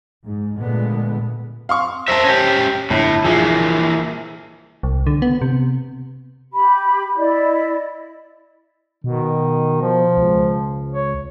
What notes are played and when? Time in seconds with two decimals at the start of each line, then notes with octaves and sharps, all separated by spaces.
0.25 G#2
0.59 A#2 D3 G#3 A3 B3
1.69 F5 C6 C#6
2.08 A#4 C5 E5 A5
2.25 C#4 G4
2.90 G1 A2
3.25 A#1 A#2 E3 A#3 G#4
4.83 C2
5.07 D3
5.22 B3
5.42 C3
6.52 G4 B5
7.15 E4 D5 D#5
9.04 B2 D#3
9.82 F3
10.17 C#2
10.93 C#5